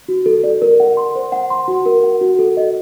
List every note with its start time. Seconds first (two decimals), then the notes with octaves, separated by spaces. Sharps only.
0.08 F#4
0.26 A4
0.44 D5
0.62 A#4
0.80 F#5
0.97 C6
1.15 C5
1.32 F#5
1.50 C6
1.68 F#4
1.86 A#4
2.03 F#5
2.21 F#4
2.39 A4
2.57 D#5